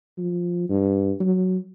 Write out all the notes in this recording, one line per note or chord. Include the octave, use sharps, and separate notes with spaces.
F3
G2
F#3